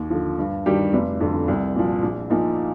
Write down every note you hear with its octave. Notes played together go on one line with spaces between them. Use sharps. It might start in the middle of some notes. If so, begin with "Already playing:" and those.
Already playing: D#2
D3 F3
G2
D#3 G3 D4 G4
F1
F2 D3
C2
A#2 F3
A#1
A#2 F3 A#3 D#4